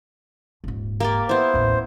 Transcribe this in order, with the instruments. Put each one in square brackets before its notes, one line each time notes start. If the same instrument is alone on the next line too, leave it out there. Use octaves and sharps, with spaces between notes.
[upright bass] D#1 G#2
[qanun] A#3 G4 D5
[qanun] B3 E4 [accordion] C5
[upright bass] A1 D#2